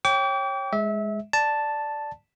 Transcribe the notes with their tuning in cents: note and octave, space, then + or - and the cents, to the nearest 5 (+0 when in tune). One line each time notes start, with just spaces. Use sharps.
C#5 -20 G5 +0 D6 -40
G#3 +0 E5 -25
D5 +0 A5 +0